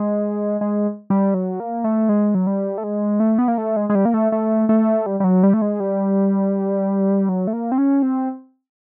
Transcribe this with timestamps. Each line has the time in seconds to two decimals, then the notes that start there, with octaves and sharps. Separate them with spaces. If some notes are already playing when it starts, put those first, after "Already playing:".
Already playing: G#3
0.61 G#3
1.10 G3
1.34 F#3
1.60 A#3
1.84 A3
2.09 G#3
2.35 F#3
2.47 G3
2.78 A3
2.84 G#3
3.20 A3
3.38 B3
3.48 A#3
3.58 A3
3.76 G#3
3.90 G#3
3.95 G3
4.05 A#3
4.14 A3
4.32 A3
4.69 A3
5.06 G3
5.20 G3
5.24 F#3
5.43 G3
5.54 A3
5.62 G#3
5.80 G3
7.29 F#3
7.47 A3
7.53 A#3
7.72 C4
7.78 C#4
8.03 C4